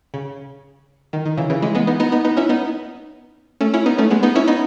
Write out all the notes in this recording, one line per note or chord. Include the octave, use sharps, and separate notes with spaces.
C#3
D#3
D#3
C#3 E3
C#3 E3
E3 G#3
G#3 B3
B3 D#4
B3 D#4
B3 D#4
B3 D#4
C#4 E4
B3 D#4
A3 C#4
C#4 E4
B3 D#4
A3 C#4
G#3 B3
B3 D#4
C#4 E4
B3 D#4